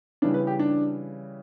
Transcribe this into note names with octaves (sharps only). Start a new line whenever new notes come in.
C#3 E3 G3 D4
B4
G4
D4